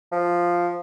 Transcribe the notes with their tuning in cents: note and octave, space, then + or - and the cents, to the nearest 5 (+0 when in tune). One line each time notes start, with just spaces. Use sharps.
F3 +0